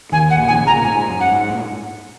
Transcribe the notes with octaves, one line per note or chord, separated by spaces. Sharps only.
D#2 D#3 G#5
F#5
A#1 A#2
D#3 G#5
C#3
A#5
A#2
G#2 G#5
F#2
F#5
G#2
A#2